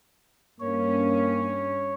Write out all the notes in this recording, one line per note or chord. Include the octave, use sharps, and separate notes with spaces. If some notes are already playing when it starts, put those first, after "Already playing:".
G2 A#3 C#4 C#5